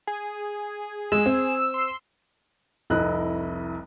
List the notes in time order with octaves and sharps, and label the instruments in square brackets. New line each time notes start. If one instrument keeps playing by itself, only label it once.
[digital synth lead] G#4
[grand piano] G#3 [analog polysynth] E6
[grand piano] C4
[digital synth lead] C6
[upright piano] F1 C2 E4 D#5 F#6